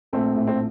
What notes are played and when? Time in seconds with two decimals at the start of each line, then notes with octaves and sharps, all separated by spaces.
0.13 A#1 A3 C4
0.35 A2
0.47 C4